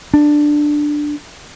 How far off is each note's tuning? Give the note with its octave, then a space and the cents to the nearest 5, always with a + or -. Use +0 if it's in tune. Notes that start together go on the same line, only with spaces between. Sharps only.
D4 +10